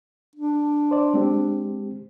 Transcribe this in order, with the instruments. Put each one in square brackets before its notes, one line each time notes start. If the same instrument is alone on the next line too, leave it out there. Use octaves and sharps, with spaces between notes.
[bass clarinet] D4
[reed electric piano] C5 D5
G#3 C4 G4